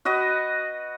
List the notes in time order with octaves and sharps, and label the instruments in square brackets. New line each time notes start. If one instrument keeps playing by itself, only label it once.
[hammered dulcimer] F#4 B4 D#5